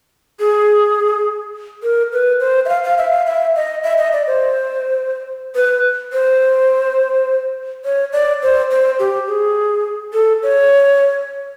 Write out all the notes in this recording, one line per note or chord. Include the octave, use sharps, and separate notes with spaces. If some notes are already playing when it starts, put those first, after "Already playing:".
G#4
A#4
B4
C5
E5
F5
F5
E5
F5
E5
D#5
E5
D#5
D5
C5
B4
C5
C#5
D5
C5
C5
G4
G#4
A4
C#5